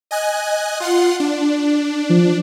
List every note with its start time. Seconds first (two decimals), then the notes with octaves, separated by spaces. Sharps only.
0.11 D#5 G#5 F#6
0.80 F4 F#5 C6
1.20 D4
2.10 F3